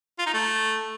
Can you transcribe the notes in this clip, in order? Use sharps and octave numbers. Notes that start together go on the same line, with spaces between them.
F4
D#4
A3